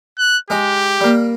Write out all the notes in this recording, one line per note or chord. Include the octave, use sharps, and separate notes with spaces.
F#6
G#3 D#4 G4
G3 A#3